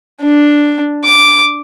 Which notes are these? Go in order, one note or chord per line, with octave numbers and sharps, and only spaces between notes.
D4
D6